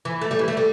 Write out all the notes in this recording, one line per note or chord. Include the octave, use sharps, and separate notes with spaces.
E3
A3
G3
E3
A3
G3